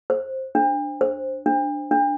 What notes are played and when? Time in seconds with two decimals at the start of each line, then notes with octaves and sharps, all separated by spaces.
0.10 C5
0.55 D4
1.01 C5
1.46 D4
1.91 D4